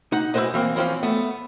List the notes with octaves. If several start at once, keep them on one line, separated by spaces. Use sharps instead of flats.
D#4 F#5
B1 E4 G4 B4 C5 D#5
E3 A#3 C4
E3 F3 C4 C#4 F4
A3 B3